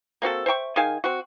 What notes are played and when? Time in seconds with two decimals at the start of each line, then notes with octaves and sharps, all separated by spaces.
0.22 A#3 C4 F#4 A4
0.46 C5 E5 G5 C#6
0.76 D#3 G#4 F5 G#5
1.04 C4 F#4